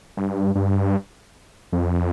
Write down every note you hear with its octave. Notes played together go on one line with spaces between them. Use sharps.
G2
G2
F2